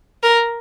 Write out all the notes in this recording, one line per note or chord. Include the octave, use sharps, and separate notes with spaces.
A#4